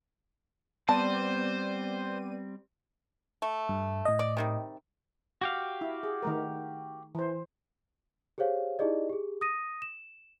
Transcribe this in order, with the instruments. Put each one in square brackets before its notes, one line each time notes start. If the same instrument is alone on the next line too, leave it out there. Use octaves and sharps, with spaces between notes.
[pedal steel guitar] G3 C4 [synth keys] B3 D5 D#7 [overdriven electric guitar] C5 [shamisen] A5
[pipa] A3
[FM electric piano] G2
A2 D#5
[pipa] D5
C3 D#3 G3
[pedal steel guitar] F#4 G4 F5
[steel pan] E4
G#4
D#3 A3 A#4
E3 C5
[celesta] G4 G#4 C5 C#5 F5
D#4 E4 G4 G#4 D5 D#5
G4 G#4
D#6 A#6 D#7
E7